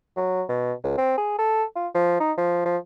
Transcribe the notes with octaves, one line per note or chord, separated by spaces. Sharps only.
F#3
B2
C#2
C4
G#4
A4
F4
F3
D#4
F3
F3